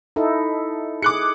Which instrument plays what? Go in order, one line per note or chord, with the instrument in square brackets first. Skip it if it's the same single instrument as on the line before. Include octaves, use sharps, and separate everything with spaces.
[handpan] D#4 E4 A4
[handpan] G#4 [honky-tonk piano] D6 F#6 C#7